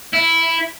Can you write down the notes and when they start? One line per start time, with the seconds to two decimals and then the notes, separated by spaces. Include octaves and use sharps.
0.13 E4